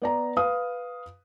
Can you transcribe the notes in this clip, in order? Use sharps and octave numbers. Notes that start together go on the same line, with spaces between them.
B3 D5 A#5
B4 F5 D#6